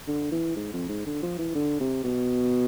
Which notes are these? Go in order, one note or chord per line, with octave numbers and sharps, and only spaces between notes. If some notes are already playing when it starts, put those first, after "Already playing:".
D3
E3
G#2
F2
G#2
D3
F3
E3
D3
C3
B2